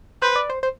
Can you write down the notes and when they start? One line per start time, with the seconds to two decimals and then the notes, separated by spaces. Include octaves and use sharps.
0.22 B4 C5
0.36 D5
0.50 C5
0.63 C5